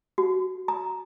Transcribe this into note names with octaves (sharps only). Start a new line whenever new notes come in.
F#4
A#5